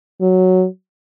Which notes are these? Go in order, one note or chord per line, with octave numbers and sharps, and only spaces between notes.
F#3